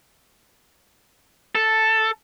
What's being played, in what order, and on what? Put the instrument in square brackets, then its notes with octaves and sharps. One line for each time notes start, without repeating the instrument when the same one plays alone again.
[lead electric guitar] A4